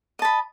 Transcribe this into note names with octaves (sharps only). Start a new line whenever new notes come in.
D#5 A5 B5